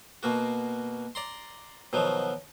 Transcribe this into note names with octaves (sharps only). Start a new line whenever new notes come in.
B2 A#3 F#4
D5 A#5 C6
B2 D#3 F3 F#3